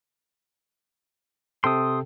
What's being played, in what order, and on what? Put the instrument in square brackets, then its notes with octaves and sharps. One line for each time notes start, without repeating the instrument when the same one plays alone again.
[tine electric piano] C3 A4 G5 [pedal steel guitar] C6 D#6